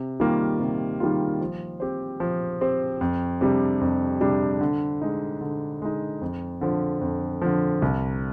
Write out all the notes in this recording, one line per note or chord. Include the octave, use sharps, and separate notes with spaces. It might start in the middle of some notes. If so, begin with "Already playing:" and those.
Already playing: C3
D#3 G3 A#3 F4
C3
D#3 G3 A#3 F4
F3
C4 G4 C5
F3
C4 G4 C5
F2
C3 G3 D4
F2
C3 G3 D4
D3
G#3 D#4
D3
G#3 D#4
F2
D3 F3
F2
D3 F3
C2